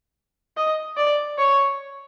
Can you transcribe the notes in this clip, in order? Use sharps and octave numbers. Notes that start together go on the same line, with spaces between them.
D#5
D5
C#5